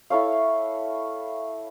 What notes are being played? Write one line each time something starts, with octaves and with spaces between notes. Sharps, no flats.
E4 A4 C#5 F5